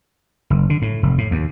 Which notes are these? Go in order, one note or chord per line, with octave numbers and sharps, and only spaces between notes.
F#1
D3
A2
F1
A2
D#2